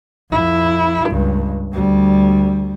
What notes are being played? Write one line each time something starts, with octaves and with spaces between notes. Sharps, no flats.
F2 E4
C#2 G2
D2 G3